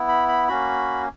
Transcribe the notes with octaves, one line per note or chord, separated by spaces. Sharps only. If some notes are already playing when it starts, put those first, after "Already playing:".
Already playing: B3 E4
B5
B5
A#3 C#4 F#4 B5